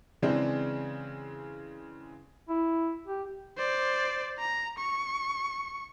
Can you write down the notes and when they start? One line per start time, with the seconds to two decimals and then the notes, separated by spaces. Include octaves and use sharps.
0.22 C#3 E3 G#3 C4 D4
2.49 E4
3.07 G4
3.57 C5 D5
4.39 A#5
4.78 C#6